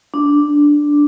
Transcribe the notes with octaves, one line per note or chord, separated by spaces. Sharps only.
D4